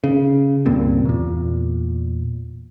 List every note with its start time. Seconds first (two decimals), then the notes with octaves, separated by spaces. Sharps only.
0.04 C#3
0.66 C#2 G2 A#2 C4
1.05 E2 A#2